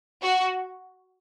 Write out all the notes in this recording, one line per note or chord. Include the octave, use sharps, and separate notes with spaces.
F#4